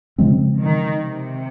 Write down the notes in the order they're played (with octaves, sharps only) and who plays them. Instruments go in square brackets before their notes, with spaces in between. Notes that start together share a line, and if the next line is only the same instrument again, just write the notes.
[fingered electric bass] C#3 F3 G#3 C4
[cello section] D#3
C3